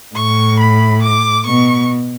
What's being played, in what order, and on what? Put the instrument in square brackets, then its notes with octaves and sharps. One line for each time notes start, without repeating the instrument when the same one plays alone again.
[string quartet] A2 [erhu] C#6
[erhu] B5
D6
[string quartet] B2 [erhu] C#6